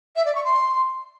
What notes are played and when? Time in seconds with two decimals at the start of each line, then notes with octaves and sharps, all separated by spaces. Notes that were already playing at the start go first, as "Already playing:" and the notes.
0.16 E5
0.25 D5
0.35 C#6
0.45 C6